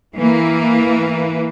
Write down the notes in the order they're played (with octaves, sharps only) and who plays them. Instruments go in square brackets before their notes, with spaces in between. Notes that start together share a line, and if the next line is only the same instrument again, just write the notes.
[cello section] E3 A#3